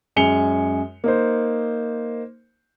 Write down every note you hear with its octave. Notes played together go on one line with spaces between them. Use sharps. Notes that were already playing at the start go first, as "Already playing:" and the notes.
F#2 G#3 G#5 C#7 F7 G7
A#3 D#4 C5